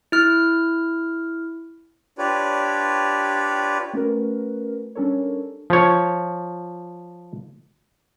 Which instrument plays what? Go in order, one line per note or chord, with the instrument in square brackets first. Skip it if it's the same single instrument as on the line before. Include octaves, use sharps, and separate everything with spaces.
[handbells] E4 F6
[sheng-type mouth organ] D4 F4 G4 B4 C#5 D5
[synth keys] A3 C#4 F#4 A#4 B4
G3 C#4 D4 A4 A#4 C#5
[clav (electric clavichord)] F3 C#5